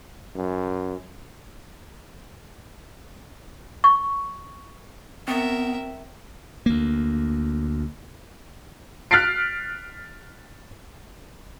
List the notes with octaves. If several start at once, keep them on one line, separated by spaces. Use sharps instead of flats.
F#2
C#6
B3 C4 A#4 E5
D2 A#3
F6 F#6 A6 B6 C7 D7